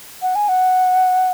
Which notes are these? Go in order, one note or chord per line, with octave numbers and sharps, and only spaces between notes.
F#5
G#5
F#5